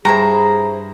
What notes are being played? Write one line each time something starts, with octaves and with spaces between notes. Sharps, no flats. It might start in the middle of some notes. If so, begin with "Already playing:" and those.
G2 E4 G#4 C5 A#5